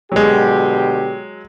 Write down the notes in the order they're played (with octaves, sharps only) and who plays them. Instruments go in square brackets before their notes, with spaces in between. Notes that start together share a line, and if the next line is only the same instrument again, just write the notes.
[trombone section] B2 D3 G4 [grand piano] F#3 G#3